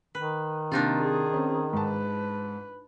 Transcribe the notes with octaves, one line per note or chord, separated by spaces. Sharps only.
D#3 B4
C3 A#3 D4 D#4 F4
G#4
C4 C#4
G#2 B4 A5